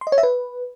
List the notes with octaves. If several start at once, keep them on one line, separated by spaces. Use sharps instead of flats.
C6
D#5
C#5
E5
B4